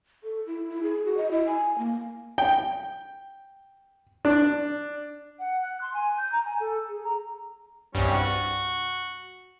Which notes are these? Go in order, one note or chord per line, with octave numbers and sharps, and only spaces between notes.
A4
E4
E4
G#4
F#4
D#5
E4
G#5
A#3
G5
D4
F#5
F#6
C6
G#5
G6
A#5
G#5
A4
G#4
A#5
C2 G2 G3 C#4
F#4